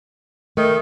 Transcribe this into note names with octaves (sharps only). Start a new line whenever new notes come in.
D#3 A3